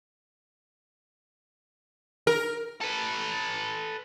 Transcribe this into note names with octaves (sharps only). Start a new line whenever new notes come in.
A#4
A4 B4